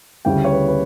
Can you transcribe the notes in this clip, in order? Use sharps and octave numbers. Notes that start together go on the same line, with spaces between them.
D2 C#3 E3 G3 G5
C#5
B4
B4